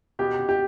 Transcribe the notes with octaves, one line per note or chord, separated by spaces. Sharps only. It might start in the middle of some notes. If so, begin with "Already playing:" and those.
B2 G4
B2
G4